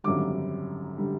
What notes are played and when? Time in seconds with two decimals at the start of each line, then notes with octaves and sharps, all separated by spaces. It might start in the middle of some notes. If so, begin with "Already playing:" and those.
0.04 G#1 F#2 D3 G3 D6
0.98 D3 G3